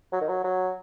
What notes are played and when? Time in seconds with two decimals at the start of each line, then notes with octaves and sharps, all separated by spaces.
0.12 F#3
0.21 D#3
0.29 F#3
0.44 F#3